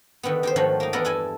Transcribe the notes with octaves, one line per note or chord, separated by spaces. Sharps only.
D3 D#3 G3 B3
D#3 G4 C5
G#2 D#3 F3 F#3 A3
A#3 D#4
E2 B3 D4 A4 A#4 D5
G2 E4 A4 G#5